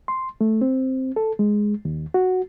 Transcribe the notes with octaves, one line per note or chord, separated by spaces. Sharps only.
C6
A3
C4
A4
G#3
D#2
F#4